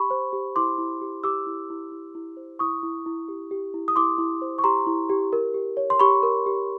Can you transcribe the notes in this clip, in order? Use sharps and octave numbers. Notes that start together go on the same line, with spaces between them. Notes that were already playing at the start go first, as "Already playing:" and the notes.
Already playing: G4 B5 C#6
C5
G4
E4 C6 D6
E4
G4
G4 D6 E6
E4
E4
E4
E4
C5
E4 C#6 D#6
E4
E4
G4
G4
E4
D#6
E4 C6 D6
E4
C5
C#6
G4 A#5 C6
E4
G4
A#4
G4
C#5
C6
G4 B5 C#6
A#4
G4